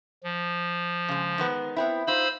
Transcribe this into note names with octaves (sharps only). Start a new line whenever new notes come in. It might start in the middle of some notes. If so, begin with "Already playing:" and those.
F3
C#3 G#3
D#3 G#3 B3
B3 C4 E4
D#4 F4 C5 B5 E6